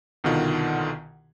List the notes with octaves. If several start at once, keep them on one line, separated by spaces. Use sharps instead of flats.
C2 B2 D3 D#3 F4 F#5